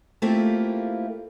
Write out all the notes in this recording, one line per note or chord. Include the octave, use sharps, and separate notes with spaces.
A3 A#3 C4 E4 F4 G4